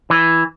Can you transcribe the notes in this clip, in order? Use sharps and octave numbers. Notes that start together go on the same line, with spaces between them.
E3